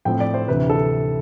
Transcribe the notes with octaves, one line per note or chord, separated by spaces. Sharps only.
A2 F3 A3 C4 G5
D5
C5
D2 C3 E3 B4
A4